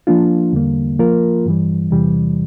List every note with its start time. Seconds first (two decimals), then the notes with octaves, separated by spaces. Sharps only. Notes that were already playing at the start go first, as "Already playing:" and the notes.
0.07 F3 A#3 D4 F4
0.53 E2 D3 G3 A#3
0.99 F3 A#3 F4 A#4
1.46 G2 E3 G3
1.91 E2 C3 E3 G3